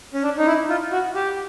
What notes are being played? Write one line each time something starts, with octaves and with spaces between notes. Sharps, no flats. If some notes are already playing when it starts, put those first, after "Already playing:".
C#4
D4
D#4
E4
F4
F#4
G4